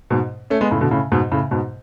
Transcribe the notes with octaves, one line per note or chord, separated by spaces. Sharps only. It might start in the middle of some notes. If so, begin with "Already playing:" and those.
G#2 B2
A3 C#4
G#3 B3
A2 C#3
B2 D3
A2 C#3
G#2 B2
A2 C#3
G#2 B2